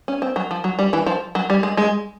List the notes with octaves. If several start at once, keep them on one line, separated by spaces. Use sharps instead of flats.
C#4
C4
F#3
F3
F#3
G3
E3
F3
F#3
G3
G#3
G#3